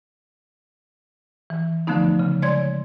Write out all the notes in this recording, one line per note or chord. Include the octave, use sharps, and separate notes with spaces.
E3
D3 F3 A3 B3 D#4
C#3
G#3 C#5 D5 C6 G#6